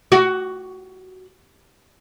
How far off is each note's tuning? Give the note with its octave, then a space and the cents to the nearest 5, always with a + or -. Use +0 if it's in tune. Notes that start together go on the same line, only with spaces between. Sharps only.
F#4 +10